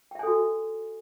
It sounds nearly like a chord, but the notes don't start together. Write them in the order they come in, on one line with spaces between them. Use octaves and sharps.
G5 E5 G#5 A4 F#4